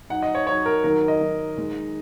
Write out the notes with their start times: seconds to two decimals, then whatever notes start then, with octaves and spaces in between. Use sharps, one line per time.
0.10 F#3 D#4 F#5
0.22 D#5
0.35 C#5
0.47 F#3 D#4 C#5
0.66 A#4
0.84 D#3 F#3 D#4 A#4
1.08 D#5
1.21 D#3 F#3 D#4
1.58 D#3 G#3 D#4